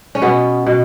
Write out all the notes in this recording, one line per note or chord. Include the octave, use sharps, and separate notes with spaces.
C#4
B2 B3
B2